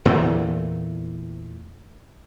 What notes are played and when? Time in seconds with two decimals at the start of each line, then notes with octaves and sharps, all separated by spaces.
0.05 E2 A#2 E3 A3